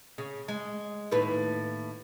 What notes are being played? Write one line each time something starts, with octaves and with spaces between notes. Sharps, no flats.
C#3
G#3
D#2 A2 B4